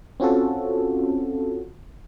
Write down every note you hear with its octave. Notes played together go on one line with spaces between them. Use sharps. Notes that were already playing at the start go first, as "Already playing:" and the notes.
C4 C#4 F4 F#4 A4